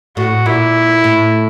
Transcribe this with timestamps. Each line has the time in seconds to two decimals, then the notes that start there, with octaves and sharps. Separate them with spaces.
0.17 A2 F#4
0.46 A#2 E4
1.04 A2